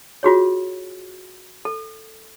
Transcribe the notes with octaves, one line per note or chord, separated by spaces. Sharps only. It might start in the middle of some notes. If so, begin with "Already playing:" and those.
F4 F#4 G#4 C#5
A4